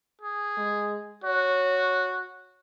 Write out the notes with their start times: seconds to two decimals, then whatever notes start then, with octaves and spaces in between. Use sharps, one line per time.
0.22 G#4
0.57 G#3
1.24 F#4 C#5